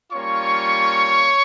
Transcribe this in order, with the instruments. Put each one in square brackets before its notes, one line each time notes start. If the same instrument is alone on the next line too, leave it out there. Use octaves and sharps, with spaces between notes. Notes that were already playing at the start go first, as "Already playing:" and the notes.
[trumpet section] G3 A#3 C#4 F4 C#5 C#6